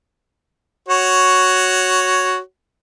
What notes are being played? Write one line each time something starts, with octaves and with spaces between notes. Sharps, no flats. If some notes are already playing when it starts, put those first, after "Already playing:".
F#4 C#5